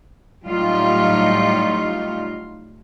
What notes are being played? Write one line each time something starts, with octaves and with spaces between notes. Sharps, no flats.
A2 F#3 G3 A3 D#4 F4